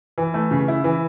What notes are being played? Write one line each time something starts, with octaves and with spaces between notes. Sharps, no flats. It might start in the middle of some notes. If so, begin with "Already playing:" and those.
E3
A3
C#3
E4
E3